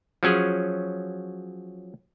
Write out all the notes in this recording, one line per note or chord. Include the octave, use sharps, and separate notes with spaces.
F3 F#3 C#4 G#4